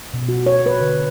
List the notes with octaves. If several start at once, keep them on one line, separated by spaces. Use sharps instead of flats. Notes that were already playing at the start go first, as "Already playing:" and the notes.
B2
F#4
C#5
B4
D3